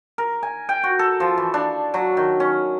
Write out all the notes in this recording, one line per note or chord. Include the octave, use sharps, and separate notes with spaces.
A#4
G#5
G5
F#4
A4
F3
E3
D4
F#3
D#3
C#4